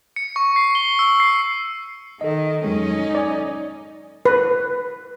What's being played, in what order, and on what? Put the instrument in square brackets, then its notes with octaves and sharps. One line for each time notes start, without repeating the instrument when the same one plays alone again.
[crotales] C#7
C#6
C7
G7
E6
C7
[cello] D#3 [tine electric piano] A4 D#5
[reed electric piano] F2 F#3 G#3 [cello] C#4 D#4
[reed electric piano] D5 G#5
[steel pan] B4